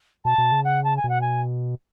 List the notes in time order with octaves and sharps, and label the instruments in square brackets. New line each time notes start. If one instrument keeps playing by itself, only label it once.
[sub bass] B2 [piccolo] A5
[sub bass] B2
C#3
[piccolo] F#5
A5
G#5
[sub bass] B2 [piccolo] F#5
[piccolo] G#5